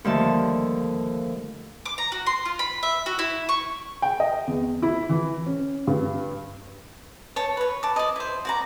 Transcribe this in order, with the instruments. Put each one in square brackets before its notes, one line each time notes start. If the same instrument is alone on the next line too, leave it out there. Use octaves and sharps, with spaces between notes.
[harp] D#2 D3 F3 G3 A3 A5
[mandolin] D6
A#5
F#4
C6
F4
B5
E5
F#4
E4
C#6
[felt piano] G5
D#5
E2
E4
E3
C#4
G2
[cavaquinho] C#5 A5
B4 C#5
A5 D6
D5 D#5
E4 C5
F#4 D5 A#5